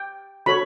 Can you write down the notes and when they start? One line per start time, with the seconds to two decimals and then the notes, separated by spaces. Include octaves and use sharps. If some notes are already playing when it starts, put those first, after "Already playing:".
Already playing: G5
0.46 F#4 A4 C#5 B5